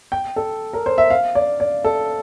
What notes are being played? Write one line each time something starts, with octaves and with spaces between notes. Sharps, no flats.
G5
A4
A#4
C5
E5
F5
D5
D5
A4